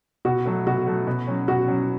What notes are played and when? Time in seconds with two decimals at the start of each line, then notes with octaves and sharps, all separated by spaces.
0.25 B2 F#4
0.45 F#3 A3
0.67 B2 F#4
0.87 F#3 A3
1.07 B2
1.27 F#3 C#4
1.48 B2 F#4
1.68 F#3 C#4